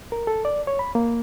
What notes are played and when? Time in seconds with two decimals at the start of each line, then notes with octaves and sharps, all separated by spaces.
0.12 A#4
0.27 A4
0.45 D5
0.67 C#5
0.79 B5
0.95 A#3